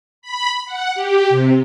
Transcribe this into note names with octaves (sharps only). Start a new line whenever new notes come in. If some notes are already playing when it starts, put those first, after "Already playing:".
B5
F#5
G4
C3